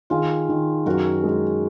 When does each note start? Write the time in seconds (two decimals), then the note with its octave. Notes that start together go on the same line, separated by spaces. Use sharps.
0.10 D#3 F4 G#4
0.49 D#3
0.86 F#2 F#4 A#4
1.24 G#3